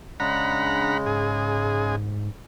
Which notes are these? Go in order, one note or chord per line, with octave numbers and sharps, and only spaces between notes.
C#3 G#3 D4 F#5 A#5 B5
G#2 G#4